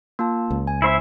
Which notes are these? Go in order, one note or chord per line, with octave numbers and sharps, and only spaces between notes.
A#3 F4 A5
C#2
G#5
E4 C5 E5